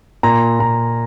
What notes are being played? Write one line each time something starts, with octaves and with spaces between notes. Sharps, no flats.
A#2 A#5
A#2 A#5